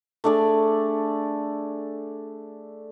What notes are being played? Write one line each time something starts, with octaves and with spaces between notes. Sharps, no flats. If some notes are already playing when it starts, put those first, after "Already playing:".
A3 D4 G#4 D5